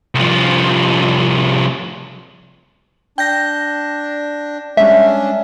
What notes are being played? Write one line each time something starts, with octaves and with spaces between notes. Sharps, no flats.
C2 F3
D4 G5 G6 A#6
G3 G#3 C#4 D4 E5